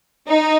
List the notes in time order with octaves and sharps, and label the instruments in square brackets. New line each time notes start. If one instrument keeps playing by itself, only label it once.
[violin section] D#4